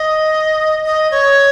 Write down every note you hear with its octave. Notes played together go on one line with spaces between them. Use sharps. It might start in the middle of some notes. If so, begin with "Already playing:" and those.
Already playing: D#5
D#5
C#5